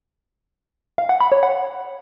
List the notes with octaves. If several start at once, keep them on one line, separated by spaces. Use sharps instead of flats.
F5
F#5
B5
C#5
F#5